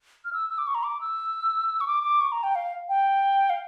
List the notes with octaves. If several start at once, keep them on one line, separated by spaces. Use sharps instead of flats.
F6
E6
E6
D6
C#6
A#5
D6
E6
C#6
D6
D6
C#6
A#5
G5
F5
G5
F5